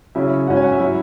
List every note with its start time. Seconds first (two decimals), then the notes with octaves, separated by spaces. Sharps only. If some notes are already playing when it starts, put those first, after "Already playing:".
0.15 C#3 F#3 C#4 E4 E5
0.47 G#2 F#3 C#4 F#5
0.56 G#5
0.64 F#5
0.72 E5
0.80 F#3 E4